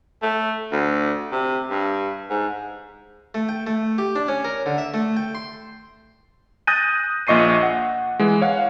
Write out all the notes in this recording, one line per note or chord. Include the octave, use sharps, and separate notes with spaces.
A3
D2
C3
G2
G#2
A3
G5
A3
G4
D4
C#4
A#4
D3
E5
A3
G5
C6
D#6 F#6 G6 A6 A#6 D#7
A#1 A#2 D#5 C#6 C7 D#7
F#5
E3 G#3
C#5 F5 F#5